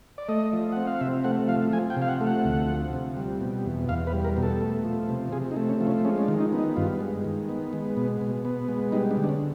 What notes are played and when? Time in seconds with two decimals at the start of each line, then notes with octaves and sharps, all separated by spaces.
0.18 D5
0.29 A3 D#5
0.53 F3
0.72 C4 F#5
0.87 F5
1.01 C3 E5
1.24 A3 F#5
1.48 F3 F5
1.73 F3 G#5
1.90 G5
1.97 C3
2.02 F5
2.08 F#5
2.21 A3
2.27 F#5
2.45 D2
2.68 F3
2.93 C3
3.17 G3
3.41 B2
3.65 E2
3.89 E2 F5
4.07 B4
4.13 G3
4.24 A#4
4.37 B2
4.43 A4
4.61 A3
4.85 F3
5.09 C3
5.32 C3 G#4
5.51 D#4
5.56 A3
5.69 C#4
5.81 F3
5.87 C#4
6.05 G#3 C#4
6.18 C#4
6.23 D4
6.28 D#3
6.40 D#4
6.53 B3
6.59 D#4
6.76 G2 F4
7.00 G#3
7.24 D#3
7.49 B3
7.73 G#3
7.97 B2
8.21 B2
8.45 B3
8.68 G#3
8.92 G3 D#4
9.11 D4
9.17 D3
9.24 D4
9.29 C#4